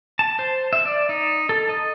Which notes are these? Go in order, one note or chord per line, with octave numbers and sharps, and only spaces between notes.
A5
C5
E5
D5
D#4
A4
D#5